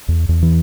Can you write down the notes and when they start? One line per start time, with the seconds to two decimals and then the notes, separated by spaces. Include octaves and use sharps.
0.08 E2
0.29 E2
0.42 E3